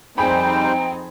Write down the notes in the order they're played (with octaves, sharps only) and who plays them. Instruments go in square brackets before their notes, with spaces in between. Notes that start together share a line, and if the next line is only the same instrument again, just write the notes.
[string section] F2 C4 D#4 [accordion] G3 C5 [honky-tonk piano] G#4 B5 [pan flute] G5